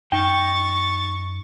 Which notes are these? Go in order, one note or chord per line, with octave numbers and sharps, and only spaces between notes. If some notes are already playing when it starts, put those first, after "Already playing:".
F#2 D#4 G5 C#6 A6